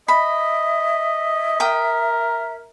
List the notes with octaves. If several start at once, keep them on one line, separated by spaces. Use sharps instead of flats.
D#5 E5 B5
A#4 G5 D#6